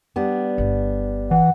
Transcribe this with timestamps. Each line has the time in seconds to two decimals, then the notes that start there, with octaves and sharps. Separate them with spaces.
0.16 G3 B3 D4
0.58 G1
1.31 E3 F#5